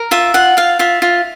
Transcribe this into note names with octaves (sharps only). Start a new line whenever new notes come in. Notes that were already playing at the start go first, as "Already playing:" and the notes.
Already playing: A#4
F4 E5
F4 F#5
F4 F5
F4 E5
F4